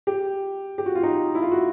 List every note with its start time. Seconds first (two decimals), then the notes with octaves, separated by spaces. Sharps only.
0.07 G4
0.78 G4
0.86 F#4
0.95 F4
1.03 D#4
1.35 E4
1.42 F4
1.52 F#4